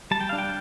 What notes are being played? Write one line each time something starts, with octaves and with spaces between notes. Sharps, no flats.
G3 A5
G5
D4 F5
G5